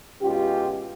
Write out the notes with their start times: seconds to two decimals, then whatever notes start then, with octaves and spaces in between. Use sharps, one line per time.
0.22 B2 G#3 C#4 F4 G4